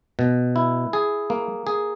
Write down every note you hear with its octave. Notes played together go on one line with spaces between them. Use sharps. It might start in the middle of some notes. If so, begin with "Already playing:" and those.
B2
E4
G#4
A#3
G#4